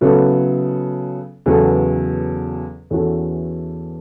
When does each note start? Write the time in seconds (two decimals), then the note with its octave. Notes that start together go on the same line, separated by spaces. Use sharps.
0.01 C#3 F#3 B3 E4 A4
1.46 E2 C#3 F#3 B3 A4
2.90 E2 E3 C#4 F#4 A4